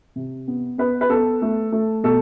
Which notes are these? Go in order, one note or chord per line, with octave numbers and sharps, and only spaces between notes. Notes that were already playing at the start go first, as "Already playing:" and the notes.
C3
B3
B3 B4
B4
B3 A4
A3
A3
B2 A4